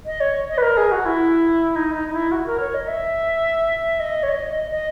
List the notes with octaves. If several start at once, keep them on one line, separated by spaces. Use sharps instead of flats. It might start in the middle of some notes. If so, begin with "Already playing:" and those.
D#5
C#5
D#5
B4
A#4
G#4
F#4
E4
D#4
D#4
D#4
E4
F#4
A#4
C#5
D#5
E5
D#5
C#5
D#5
D#5
D#5